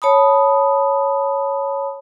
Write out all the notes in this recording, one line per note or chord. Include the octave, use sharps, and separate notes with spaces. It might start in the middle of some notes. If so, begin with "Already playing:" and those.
C#5 A5 B5 D#6